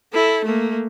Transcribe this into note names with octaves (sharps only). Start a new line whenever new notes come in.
E4 A4
A3 A#3